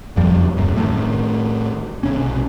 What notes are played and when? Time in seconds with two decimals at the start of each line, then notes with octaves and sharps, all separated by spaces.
0.16 F#1 F2 F3 G3
0.57 D#1 F#2
0.76 A2 D#3
2.03 B1 C3 C#4